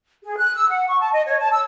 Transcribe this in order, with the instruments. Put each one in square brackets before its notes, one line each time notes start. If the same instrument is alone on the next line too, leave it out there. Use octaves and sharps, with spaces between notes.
[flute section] G#4
F#6
E6
F#5
C#6
A5
D#5
C#5
A5
E6